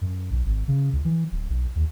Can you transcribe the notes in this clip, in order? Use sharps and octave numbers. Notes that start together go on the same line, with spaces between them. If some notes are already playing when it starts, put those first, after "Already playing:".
F#2
B1
G#1
C#3
C#2
E3
D1
B1
D#2